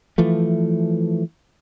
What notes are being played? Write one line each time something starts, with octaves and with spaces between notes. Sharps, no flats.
E3 F3 A3